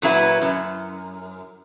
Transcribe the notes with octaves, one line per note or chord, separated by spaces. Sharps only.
A#2 F#3 E4 B4
F#2